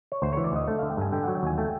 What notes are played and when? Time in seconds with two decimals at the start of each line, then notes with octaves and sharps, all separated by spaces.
0.12 C#5
0.22 D2 C5
0.33 E3 C#5
0.44 D5
0.52 D2 D#5
0.68 A3
0.79 D3 F5
0.90 G5
0.97 G2 G#5
1.12 D3 G5
1.24 F#3 F#5
1.35 G5
1.43 D#2 G#5
1.58 A3 G5